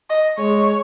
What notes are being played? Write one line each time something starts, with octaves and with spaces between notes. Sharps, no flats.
D#5
G#3 C#5